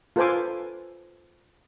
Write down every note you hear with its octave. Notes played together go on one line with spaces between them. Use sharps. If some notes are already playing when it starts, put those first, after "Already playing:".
F4 A4 B4 C5 G#5 D6